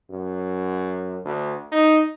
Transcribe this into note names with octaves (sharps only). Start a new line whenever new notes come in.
F#2
D2
D#4